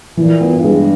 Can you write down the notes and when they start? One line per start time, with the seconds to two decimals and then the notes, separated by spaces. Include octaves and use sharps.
0.17 A#2 E3
0.41 B3
0.52 G2
0.64 G#3